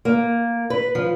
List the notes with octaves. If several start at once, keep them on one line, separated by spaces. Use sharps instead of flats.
A#3
B4
F3